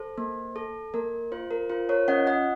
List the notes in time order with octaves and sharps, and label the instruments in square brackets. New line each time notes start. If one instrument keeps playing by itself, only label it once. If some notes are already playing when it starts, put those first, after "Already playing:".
Already playing: [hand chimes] A4 C5
A#3
A4
A#3 A#4
F4 C5
A#4
F4 C5
A#4 C#5
C#4 D#5 F#5
D#5 F#5